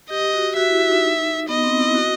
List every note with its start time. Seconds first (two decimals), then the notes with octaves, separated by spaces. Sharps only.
0.10 G4 D#5
0.34 F#4
0.56 F#4 E5
0.68 E4
0.79 F#4
0.91 D#4
1.49 B3 D#5
1.64 C4
1.80 E4
1.95 F#4